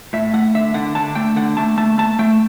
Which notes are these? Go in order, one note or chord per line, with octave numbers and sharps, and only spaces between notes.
A2 E5
A3 F#5
D3 E5
D3 F#5
D3 A5
A3 G5
D3 F#5
A3 A5
A3 A5
A3 A5
A3 G5